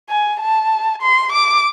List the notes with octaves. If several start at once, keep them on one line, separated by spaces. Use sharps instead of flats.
G#5
A5
C6
D6